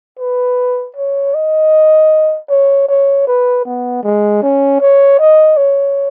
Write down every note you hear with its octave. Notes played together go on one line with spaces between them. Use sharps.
B4
C#5
D#5
C#5
C#5
B4
B3
G#3
C#4
C#5
D#5
C#5